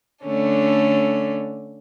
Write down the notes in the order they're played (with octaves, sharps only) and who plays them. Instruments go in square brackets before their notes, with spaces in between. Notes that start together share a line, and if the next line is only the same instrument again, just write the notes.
[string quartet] D3 A3 C#4 D4